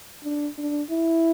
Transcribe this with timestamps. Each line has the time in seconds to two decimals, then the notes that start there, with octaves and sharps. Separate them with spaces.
0.24 D4
0.58 D4
0.91 E4